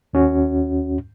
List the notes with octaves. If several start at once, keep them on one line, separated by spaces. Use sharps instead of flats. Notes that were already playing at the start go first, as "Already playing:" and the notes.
D#2 C#4 F#4